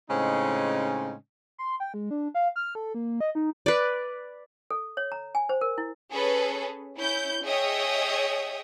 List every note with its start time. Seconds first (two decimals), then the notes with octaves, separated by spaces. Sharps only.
0.10 A2 C#3 G#3 C4 C#4 D#4
1.58 C6
1.80 G5
1.94 G#3
2.11 D4
2.34 F5
2.56 F6
2.75 A4
2.95 A#3
3.21 D#5
3.35 D#4
3.66 B4 D5
4.71 A4
4.97 C#5
5.12 A#5
5.35 G#5
5.49 C5
5.61 A#4
5.78 E4
6.10 C#4 G#4 A4 B4
6.97 C#4 E4 G6
7.43 G#4 C#5 D#5 E5 G5 D#6